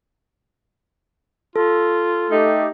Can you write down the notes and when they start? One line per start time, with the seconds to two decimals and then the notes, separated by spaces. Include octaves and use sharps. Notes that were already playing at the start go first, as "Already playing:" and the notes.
1.56 F4 A4
2.31 A3 D#4 G4